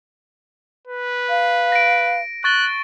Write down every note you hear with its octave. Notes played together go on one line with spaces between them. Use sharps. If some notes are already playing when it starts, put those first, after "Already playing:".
B4
F5
A#6 D7
C#6 F#6 A6 G7